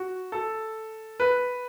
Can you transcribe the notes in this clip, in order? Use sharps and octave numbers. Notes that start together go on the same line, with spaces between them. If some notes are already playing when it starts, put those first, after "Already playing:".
Already playing: F#4
A4
B4